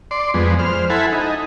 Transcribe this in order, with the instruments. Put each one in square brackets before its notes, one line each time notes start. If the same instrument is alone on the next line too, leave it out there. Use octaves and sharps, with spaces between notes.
[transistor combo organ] D5 C6
F2 G#3 B3
C5 F6
E4 A4 F#5 G#5 B5
D#4